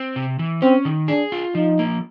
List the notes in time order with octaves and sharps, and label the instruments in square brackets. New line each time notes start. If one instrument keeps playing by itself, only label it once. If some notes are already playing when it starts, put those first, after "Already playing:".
Already playing: [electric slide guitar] C4
C3
E3
[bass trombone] C4 [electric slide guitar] C#4
[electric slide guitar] D#3
[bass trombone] D4 [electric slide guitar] G#4
[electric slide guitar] F4
[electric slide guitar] F3 [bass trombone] D#4
[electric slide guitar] A#3